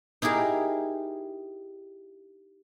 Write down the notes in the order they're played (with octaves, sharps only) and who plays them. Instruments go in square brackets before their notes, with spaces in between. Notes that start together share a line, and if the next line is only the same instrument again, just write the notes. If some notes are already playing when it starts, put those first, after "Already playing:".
[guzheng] D#4 E4 G4 G#4 A#4